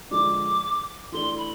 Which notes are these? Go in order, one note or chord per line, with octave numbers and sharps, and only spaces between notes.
D3 F3 G#3 D4 D6
E3 A3 D4 C6
B5